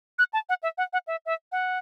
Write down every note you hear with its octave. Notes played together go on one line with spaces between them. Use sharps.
F#6
A5
F#5
E5
F#5
F#5
E5
E5
F#5